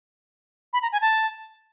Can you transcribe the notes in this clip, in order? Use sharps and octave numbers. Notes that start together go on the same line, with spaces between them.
B5
A#5
G#5
A5